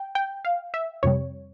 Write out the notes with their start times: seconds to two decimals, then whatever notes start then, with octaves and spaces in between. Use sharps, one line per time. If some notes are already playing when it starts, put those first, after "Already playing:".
Already playing: G5
0.15 G5
0.45 F5
0.74 E5
1.03 F2 C3 G3 C#5